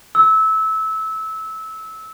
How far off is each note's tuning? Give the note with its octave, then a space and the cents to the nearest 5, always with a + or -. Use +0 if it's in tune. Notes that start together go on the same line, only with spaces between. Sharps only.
E6 -20